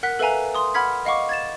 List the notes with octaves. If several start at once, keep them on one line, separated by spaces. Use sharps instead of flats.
A#4 F#5 F#6 B6
A4 B4 E5 F5 G#5 A#5
C6 D#6
F#5 B5 F6 G#6 B6
D#5 F5 F#5 C#6 D6
G#6 A6 E7